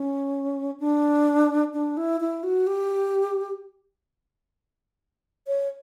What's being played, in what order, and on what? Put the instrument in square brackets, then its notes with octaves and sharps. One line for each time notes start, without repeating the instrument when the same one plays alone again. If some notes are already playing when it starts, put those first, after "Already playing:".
Already playing: [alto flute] C#4
D4
D4
E4
E4
F#4
G4
C#5